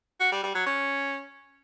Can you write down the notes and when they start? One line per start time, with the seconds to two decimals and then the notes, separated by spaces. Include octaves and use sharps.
0.20 F#4
0.32 G3
0.43 G3
0.55 F#3
0.66 C#4